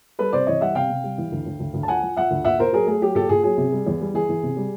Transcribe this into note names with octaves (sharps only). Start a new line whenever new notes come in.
G3 A4 B4
C3 C5 D5
E3 C#5 D#5
G3 E5 F#5
C3 F5 G5
C3
G3
E3
D2
D2
D2
D2
A5
F3 F#5 G#5
F3
F3 E5 F#5
D2
A#2 E5 F#5
A#2 A#4 C5
F#3 G#4 A#4
A3 G#4
F#3 G4
A#2 G4 A4
A#2 G#4
F#3 G#4
C3
G3
E2
G3
E3 G#4
E3
C3
G3